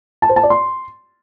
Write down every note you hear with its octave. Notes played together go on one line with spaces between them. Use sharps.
A5
C5
A5
D5
C6